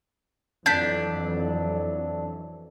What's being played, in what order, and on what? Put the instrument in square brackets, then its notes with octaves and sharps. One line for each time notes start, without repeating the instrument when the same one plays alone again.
[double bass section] F2 E3 F#3 [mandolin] D4 [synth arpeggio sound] G6 B6